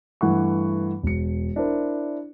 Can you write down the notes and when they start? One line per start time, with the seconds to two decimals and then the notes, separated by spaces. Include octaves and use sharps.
0.21 G2 E3 A3 F#5 C#6
1.03 E1 C#7
1.56 D4 E4 A#4 C5